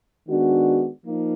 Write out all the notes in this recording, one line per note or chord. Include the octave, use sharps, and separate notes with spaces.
D#3 G#3 B3 D4 F#4
F3 A#3 D#4